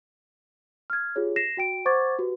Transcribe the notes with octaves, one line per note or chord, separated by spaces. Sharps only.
F6 G#6
F4 G4 G#4 C#5
A#6 C7 E7
F#4 G5 D7
C5 F#5 C#6 D6 G#6 A6
F#4 G4 B4